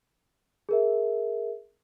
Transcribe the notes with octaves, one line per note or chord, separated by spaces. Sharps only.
G#4 A#4 E5